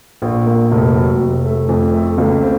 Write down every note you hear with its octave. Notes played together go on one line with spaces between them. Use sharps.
A#1
A#3
F1
F#3
F1
A3
F2
A3
C#2
C4